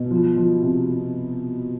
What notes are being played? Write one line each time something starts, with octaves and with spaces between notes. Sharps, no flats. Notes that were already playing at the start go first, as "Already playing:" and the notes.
Already playing: B2
F3
F3
C3
C3